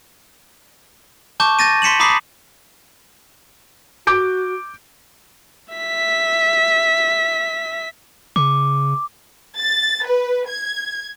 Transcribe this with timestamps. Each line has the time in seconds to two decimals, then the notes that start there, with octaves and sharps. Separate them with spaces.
1.40 A5 C#6 D6 G6
1.59 G6 A6 A#6 D#7
1.82 C6 B6 C#7 E7 F#7
2.00 A#5 B5 D6 D#6 B6 C7
4.07 F#4 D6 G6 D7
5.74 E5 B6
8.36 C#3 D6
9.58 A6
10.06 B4
10.48 G#6